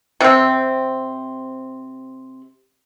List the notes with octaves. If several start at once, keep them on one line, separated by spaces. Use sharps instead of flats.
C3 C4